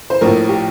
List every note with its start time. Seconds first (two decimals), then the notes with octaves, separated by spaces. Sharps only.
0.10 C5
0.21 A#1 A2 F3 A#4
0.49 G4